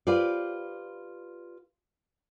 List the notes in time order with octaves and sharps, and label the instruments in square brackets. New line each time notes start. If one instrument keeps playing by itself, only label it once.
[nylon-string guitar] F4 G4 B4 C5 D5